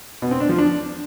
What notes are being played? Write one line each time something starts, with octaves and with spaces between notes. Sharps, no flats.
B2
C4
D4
F3
D4